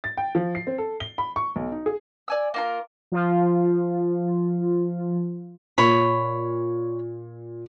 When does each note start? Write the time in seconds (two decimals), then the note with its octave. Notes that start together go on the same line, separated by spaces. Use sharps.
0.04 A6
0.17 G5
0.35 F3
0.55 C7
0.67 C4
0.78 A4
1.00 G7
1.18 B5
1.36 C#6
1.56 B1
1.72 D#4
1.86 G#4
2.28 D5 G#5 E6
2.54 A#3 F4 A#4
3.12 F3 F4
5.78 A#2 C#5 B5